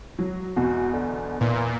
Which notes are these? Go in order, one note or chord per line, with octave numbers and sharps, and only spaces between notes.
F#3
E2 B2 F#4
D3
A#2 E3